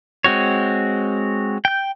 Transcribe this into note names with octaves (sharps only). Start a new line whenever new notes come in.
G#3 C4 F#4 C#5
G5 G6